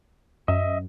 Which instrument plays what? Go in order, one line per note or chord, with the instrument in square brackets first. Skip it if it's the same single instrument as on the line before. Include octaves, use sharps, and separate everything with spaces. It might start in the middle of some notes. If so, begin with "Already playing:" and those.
[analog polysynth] F#2 [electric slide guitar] D#5 E5